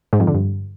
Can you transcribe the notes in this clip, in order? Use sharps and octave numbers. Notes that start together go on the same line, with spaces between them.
G#2
F2
D3
G2